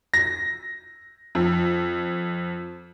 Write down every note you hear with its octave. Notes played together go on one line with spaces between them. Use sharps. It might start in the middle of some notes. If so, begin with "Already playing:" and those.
A#6
F2